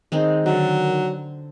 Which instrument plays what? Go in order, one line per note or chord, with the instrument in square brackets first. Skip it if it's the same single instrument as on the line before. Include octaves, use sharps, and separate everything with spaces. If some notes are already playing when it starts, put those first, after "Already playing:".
[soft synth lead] D#3 [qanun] G#3 C4 D#4
[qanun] D3 [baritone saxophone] F#3